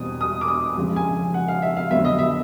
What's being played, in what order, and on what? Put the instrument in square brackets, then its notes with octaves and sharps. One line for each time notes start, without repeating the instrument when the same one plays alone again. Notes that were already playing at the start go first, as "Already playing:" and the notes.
Already playing: [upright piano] E2 B2 G3 C4 D#6
D#6
D6
D#6
F2 C#3 F3 G#3
G#5
F#5
F5
E5
F5
F2 D3 F#3 B3 E5
D#5
E5